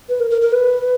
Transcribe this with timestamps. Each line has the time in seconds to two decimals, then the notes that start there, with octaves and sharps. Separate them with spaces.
0.09 B4
0.20 A#4
0.31 A#4
0.42 A#4
0.52 B4